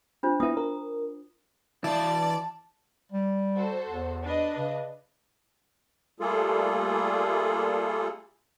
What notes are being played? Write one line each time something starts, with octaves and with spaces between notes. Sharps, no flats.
D4 F4 C5
B3 E4 D#6
A#4
E3 E4 D5 F5 A5
G3
F#4 A4 C5
E2
D4 B4 D#5
C#3
G3 A3 A#3 F4 G#4 A4